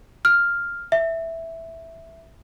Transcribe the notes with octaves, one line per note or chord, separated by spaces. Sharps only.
F6
E5